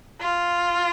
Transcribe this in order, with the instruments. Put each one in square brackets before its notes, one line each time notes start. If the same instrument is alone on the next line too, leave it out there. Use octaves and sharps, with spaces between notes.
[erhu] F4